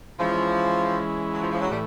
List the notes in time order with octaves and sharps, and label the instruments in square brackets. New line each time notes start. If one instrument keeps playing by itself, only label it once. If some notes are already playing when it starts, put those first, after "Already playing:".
[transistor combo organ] E3 G#3 C#4 E4 [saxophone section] F3
[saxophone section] F#3
F3
F3
F#3
[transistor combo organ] A2 E3 A3 [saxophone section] G3